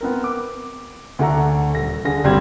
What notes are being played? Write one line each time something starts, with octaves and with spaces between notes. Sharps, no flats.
B3 C4 A#4
D6
D2 A3 F#5 A#5
D#1 A#6
D3 G#4 A#6
D1 G1 G3 C4 G#6